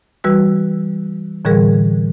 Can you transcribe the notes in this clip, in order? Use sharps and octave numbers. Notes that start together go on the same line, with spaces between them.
E3 G3 F#4 B4 E6
A2 D3 E3 G3 G#4 A#4